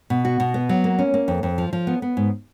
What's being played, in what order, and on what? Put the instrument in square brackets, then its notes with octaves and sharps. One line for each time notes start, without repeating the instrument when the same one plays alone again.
[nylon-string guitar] B2
F#4
B2
B3
F#3
A#3
C#4
A#3
F2
F2
F3
F3
B3
B3
G#2